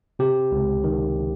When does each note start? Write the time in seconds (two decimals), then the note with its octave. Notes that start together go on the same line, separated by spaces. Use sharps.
0.19 C3 G4
0.52 C#2
0.84 D#3